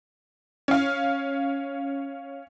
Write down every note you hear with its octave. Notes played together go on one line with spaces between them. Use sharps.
C#4 F5